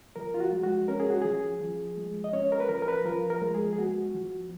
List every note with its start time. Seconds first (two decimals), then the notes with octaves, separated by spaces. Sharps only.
0.16 F3 A#4
0.34 F4
0.40 F#4
0.53 G#3
0.64 F#4
0.88 C#4 A#4
1.00 G#4
1.10 F#4
1.22 F3 G#4
1.61 F3
1.97 G#3
2.24 D#5
2.33 C#4 C#5
2.52 A#4
2.60 B4
2.69 F3 A#4
2.82 A#4
2.88 B4
3.05 F3 A#4
3.30 A#4
3.42 G#3
3.54 G#4
3.73 G#4
3.79 B3 F#4
4.15 F3